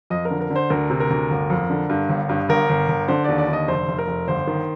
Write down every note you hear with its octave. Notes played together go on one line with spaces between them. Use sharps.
F2 D#5
A#4
D3
A#4
D3
C5
D2 A#4
C3
A#4
D2
G1
F2
D3
G2
G1
G2
G1 A#4
G1
G1
D3 C5
D#2 D5
D5
D3
D#5
F1 C5
F1
A#4
F1
G1 C5
D#3